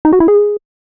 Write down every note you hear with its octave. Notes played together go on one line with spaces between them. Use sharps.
D#4
F#4
E4
G#4